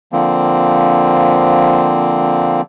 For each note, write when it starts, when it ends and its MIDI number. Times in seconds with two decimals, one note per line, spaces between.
0.12 2.61 50
0.12 2.61 53
0.12 2.61 58
0.12 2.61 60